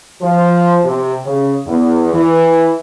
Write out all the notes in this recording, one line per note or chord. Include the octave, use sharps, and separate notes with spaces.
F3
C3
C#3
E2
E3